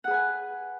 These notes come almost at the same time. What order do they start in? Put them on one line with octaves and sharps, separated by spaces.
F#5 G#4 B4 G#5